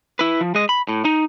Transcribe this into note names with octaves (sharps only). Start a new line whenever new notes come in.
E4 B4
F3
G#3 D#5
B5
A2
D#4